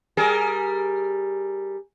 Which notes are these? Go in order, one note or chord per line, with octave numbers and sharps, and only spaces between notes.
G3 G#4 A#4